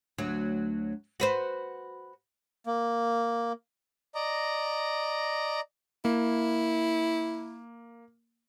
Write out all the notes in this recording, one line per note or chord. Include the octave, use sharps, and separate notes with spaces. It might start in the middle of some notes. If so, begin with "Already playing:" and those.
D2 F#3
F#4 B4 C5
A#3
D5 D#5 A#5
A#3 E4